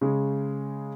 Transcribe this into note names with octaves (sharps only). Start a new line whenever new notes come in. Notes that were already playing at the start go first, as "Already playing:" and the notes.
C#3 G#3